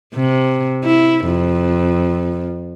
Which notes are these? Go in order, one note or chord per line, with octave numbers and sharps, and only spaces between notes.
C3
E4
F2